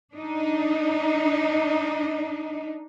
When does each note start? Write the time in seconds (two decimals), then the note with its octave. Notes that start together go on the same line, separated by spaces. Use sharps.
0.14 D4 D#4